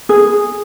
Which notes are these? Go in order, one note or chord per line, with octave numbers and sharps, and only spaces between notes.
G#4